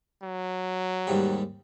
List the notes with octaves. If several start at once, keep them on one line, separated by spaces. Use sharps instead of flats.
F#3
D#2 G#2 G3